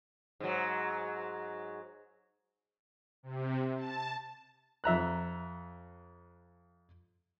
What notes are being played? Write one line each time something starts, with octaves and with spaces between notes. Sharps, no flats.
G#2 F#3
C3
A5
F2 E5 A#5 F#6